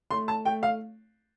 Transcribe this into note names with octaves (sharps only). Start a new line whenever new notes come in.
A3 C6
A5
A3 G5
F5